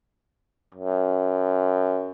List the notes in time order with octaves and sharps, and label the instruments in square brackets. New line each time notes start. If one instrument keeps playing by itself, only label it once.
[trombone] F#2